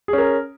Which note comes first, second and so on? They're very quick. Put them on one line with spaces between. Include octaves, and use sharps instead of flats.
G#4 C#4 A#4